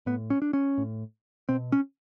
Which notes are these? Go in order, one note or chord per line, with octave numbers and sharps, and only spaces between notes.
A2 B3
C#4
D4
C#4
A2
B2 C4
C#4